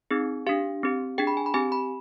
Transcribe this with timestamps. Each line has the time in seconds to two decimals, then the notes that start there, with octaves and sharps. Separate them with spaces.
0.11 C4 D#4 G#4
0.47 D4 G4 F5
0.83 C4 G4
1.18 D4 G#4 G5
1.27 B5
1.37 G#5
1.46 B5
1.54 C4 G4 G#5
1.72 B5